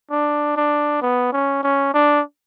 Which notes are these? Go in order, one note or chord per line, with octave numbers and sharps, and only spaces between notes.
D4
D4
B3
C#4
C#4
D4